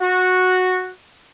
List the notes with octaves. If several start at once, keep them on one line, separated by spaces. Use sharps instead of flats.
F#4